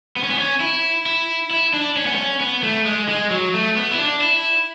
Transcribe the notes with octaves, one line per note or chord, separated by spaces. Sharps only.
B3
C#4
B3
C#4
E4
E4
E4
D4
C#4
B3
C#4
B3
A3
G#3
G#3
F#3
A3
B3
E4
D4
E4